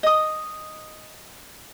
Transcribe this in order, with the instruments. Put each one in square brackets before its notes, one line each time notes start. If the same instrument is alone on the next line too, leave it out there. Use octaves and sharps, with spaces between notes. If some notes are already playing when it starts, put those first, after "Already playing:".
[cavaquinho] D#5 D#6